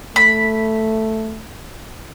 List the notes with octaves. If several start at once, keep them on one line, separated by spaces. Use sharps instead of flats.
A3 B5